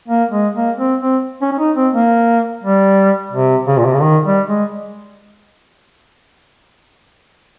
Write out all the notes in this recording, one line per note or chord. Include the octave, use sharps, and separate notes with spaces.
A#3
G#3
A#3
C4
C4
C#4
C#4
D#4
C4
A#3
G3
C3
C#3
A#2
C3
C#3
D#3
G3
G#3